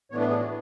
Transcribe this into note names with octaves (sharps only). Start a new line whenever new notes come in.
A2 E3 B3 D4 C#5
B4
G#4
F#4